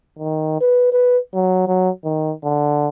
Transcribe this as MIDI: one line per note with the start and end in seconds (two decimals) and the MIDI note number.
0.19 0.60 51
0.61 0.91 71
0.93 1.18 71
1.34 1.67 54
1.67 1.90 54
2.05 2.32 51
2.44 2.88 50